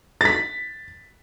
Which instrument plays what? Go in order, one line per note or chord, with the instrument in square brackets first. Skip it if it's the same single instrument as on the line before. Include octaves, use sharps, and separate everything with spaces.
[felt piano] A6 B6